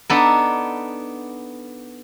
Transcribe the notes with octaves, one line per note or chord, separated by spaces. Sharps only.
B3 D4 D#4 A4